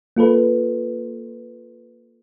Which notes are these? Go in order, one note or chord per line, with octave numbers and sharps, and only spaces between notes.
A#3 F4 A4 B4